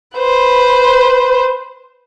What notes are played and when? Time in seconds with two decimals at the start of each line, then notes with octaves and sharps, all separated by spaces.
0.15 B4 C5